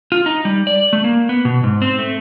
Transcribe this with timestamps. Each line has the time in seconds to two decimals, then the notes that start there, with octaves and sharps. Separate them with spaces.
0.12 F4
0.26 D#4
0.45 G3
0.67 D5
0.93 A3
1.04 A#3
1.29 B3
1.45 B2
1.63 G#2
1.82 C4
1.99 A3